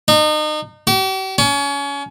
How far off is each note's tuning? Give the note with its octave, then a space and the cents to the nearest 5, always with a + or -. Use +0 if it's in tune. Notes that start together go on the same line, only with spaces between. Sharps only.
D#4 -35
G4 -45
C#4 +30